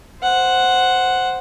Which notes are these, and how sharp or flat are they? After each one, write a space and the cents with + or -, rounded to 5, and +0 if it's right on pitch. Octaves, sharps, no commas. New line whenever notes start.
C5 +0 F#5 +0